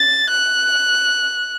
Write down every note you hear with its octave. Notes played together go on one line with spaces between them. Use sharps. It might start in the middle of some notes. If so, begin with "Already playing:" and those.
Already playing: A6
F#6